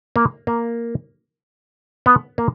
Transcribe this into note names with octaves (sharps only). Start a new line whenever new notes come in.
A#3
A#3
B3
A#3